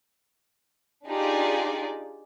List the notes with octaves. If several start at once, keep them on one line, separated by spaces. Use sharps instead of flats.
D4 D#4 F4 G4 G#4 D5